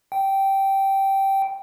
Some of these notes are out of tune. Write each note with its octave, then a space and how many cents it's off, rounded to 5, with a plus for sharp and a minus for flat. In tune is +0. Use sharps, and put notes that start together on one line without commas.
G5 -10